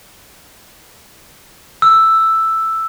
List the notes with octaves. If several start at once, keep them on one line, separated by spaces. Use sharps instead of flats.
E6